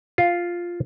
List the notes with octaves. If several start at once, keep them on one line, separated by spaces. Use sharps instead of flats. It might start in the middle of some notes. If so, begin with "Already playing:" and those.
F4